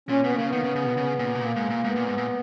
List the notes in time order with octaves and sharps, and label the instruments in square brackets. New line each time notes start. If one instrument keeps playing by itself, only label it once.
[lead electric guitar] A#2 [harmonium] C#4
[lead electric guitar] B2 [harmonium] B3
[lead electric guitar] C#3 [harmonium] A#3
[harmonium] B3
[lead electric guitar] D#3
C#3
C#3
B2
C#3
A#2
B2
[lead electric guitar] A#2 [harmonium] A#3
[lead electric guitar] G#2
A#2
[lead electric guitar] G#2 [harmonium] B3
[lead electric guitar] A#2
G#2
A#2